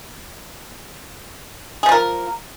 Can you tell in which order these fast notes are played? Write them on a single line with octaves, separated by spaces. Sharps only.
G#4 F3 F4 A#4